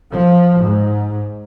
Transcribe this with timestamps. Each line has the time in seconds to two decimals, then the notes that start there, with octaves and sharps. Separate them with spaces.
0.12 F3
0.65 G#2